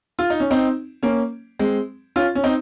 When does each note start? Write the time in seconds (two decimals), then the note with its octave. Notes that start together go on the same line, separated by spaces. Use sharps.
0.19 F4
0.30 D#4
0.40 C#4
0.51 C4 D#4
1.03 A#3 C#4
1.59 G#3 C4
2.16 C#4 F4
2.35 C#4
2.44 C4 D#4